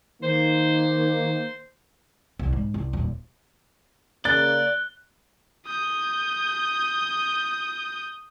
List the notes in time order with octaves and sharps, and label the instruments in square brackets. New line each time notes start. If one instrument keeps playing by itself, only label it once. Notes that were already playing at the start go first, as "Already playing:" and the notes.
[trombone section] D#3 A#3 [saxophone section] C5
[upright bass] C2
G#2
C2
D#1
[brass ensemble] C#3 A#3 [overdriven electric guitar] D5 [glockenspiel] F#6 G7 [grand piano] A6
[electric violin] D#6 G6